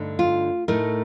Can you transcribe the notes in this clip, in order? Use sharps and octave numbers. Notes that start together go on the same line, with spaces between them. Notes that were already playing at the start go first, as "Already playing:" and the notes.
Already playing: G2 D3 A3 D#4
F4
A2 A3 D#4 A#4